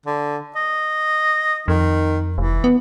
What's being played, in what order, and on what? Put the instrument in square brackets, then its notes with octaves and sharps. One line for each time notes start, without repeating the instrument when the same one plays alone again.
[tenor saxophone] D3
D#5
[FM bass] F2 [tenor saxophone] D#3
[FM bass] F1 [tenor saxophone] E3
[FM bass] B3